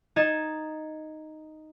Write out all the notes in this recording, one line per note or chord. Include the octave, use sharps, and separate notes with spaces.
D#4 D#5 G#6 A6 E7